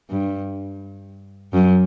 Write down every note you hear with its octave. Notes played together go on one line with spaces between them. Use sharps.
G2
F#2